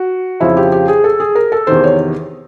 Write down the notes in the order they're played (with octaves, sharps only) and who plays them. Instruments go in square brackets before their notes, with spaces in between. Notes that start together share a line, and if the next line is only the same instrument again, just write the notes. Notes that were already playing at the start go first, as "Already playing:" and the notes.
Already playing: [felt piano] F#4
F2 C#3 F3 E4
G4
G4
G#4
A4
G#4
A#4
A4
E2 C3 D#3 C5
C#5